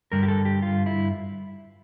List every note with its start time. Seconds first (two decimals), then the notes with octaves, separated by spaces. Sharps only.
0.12 G2 D3 G3 A#4
0.23 G4
0.28 A4
0.45 G4
0.62 F4
0.86 E4